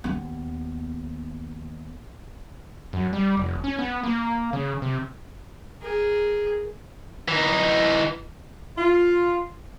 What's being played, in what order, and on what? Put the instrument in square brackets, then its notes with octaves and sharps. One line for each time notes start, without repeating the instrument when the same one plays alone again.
[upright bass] D#2 B3
[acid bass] F#2
G3
F1
C#4
B3
A#3
C#3
C3
[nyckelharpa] G#4 A#4
[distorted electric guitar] E3 D#4
[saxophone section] F4